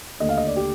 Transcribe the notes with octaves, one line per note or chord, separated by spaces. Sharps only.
D#2 D3 A3 D#5
F5
D#5
D5
G4